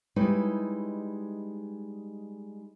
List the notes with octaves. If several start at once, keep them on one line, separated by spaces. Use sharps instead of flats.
G3 G#3 D#4 E4 B4 C#5